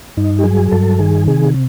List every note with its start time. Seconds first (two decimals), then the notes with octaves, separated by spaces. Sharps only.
0.17 G2 D#4
0.39 G4
0.44 F#3 G#4
0.72 G2 A4
0.99 D#3 G#4
1.27 C3 G#4